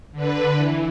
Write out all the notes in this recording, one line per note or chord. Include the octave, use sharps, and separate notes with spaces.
D3 B4
E3